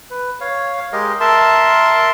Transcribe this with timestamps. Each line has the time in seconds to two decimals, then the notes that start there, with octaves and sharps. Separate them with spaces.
0.10 B4
0.41 C#5 F5
0.92 G#3 G4 A#4 D#5
1.20 A#4 E5 A5 C6